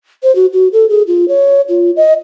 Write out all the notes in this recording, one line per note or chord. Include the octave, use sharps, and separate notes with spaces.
C5
F#4
F#4
A4
G#4
F4
C#5
F4
D#5